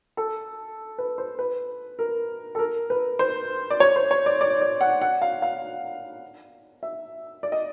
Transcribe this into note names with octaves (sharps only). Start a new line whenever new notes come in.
A4
B4
C5
B4
A#4
A4
A#4
B4
C5
D5
C#5
C5
C#5
D5
D5
D5
F#5
F#5
F5
F5
E5
D5
D#5